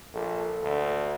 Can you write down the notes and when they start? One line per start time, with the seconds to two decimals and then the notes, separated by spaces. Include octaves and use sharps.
0.14 A#1 A4
0.62 D2